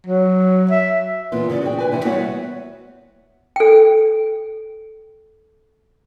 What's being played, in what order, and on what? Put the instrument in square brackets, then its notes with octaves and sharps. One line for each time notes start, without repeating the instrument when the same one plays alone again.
[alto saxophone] F#3
E5
[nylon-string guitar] A#2 E3 B3 F4
F#2 C#3 E3 D5
F#4 G#4 C#5 D5 G5
D4 B4 G#5
C3 E3 E4 F#4
G3 B3 F#4 C#5 E5 F#5
[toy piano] A4 G5